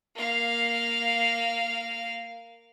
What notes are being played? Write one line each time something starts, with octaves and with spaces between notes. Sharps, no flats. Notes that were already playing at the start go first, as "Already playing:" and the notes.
A#3 F5